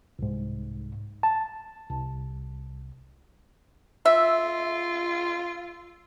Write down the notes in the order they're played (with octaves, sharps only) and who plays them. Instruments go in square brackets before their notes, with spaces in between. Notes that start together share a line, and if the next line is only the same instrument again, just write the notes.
[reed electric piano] C2 G#2
A5
C2
[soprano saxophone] F4 [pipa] E5 [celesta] E6